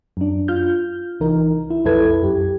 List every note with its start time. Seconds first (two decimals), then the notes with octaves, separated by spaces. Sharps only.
0.17 F#2 D4
0.48 F4 F6 G6
1.20 C2 E3 D#4 A#4
1.70 E4
1.85 B1 F2 E4 A4 B4 G#6
2.23 F#2 G4